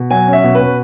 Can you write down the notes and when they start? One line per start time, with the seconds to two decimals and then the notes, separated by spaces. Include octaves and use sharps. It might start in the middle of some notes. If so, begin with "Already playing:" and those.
Already playing: B2
0.10 F#3 G#5
0.28 C#4
0.33 E5
0.44 B2
0.55 B4
0.60 B2